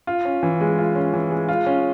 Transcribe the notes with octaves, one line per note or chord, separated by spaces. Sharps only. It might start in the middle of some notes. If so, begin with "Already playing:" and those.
F4
C#4
E3
G#3
F4
C#4
E3
G#3
F4
C#4